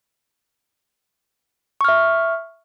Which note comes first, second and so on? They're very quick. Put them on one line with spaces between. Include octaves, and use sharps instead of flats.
C#6 F6 E5